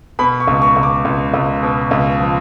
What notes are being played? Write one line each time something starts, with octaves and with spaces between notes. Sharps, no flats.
B2 B5
C#6
C#2
C#6
C#2
D6
C#2
C#2
B2
C#2
F3